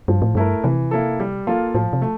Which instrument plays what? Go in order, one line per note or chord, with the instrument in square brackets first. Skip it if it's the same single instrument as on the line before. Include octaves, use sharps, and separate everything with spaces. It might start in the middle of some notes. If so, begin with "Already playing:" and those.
[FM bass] G2 [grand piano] F3
[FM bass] A2
[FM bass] G2 [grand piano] A3 E4 A#4
[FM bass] C3 [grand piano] E3
[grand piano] A#3 E4 A4
G3
A#3 F4 A4
[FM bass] A2 [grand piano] F3
[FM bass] C3
[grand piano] A3